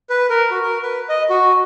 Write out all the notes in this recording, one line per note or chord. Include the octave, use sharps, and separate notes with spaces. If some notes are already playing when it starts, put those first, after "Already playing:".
B4
A#4
F#4
A#4
B4
D#5
F#4